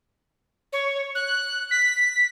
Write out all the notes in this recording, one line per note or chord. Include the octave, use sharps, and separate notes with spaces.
C#5
F#6
B6